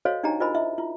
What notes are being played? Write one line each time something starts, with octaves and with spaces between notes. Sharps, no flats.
F#4 A4 C5 C#5 D#5 F5
D4 D#4 G4 D#5 G#5 A#5
F4 A#4 C5 D#5 G#5 B5
E4 D#5 E5
E4 F4